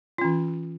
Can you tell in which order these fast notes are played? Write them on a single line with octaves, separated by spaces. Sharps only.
F4 C#4 E3